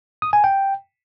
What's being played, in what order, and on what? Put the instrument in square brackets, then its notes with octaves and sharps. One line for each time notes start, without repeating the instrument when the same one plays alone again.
[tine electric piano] D#6
G#5
G5